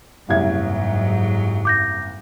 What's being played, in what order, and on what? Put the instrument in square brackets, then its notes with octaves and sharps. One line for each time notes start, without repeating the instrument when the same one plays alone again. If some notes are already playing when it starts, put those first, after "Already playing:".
[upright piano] F#1 C2 G#6 [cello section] G#2 F#3
[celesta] D6 G6 A#6